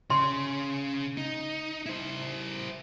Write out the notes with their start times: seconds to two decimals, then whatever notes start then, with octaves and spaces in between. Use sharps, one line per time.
0.10 C#3 C6
1.17 D#4
1.86 E4 C5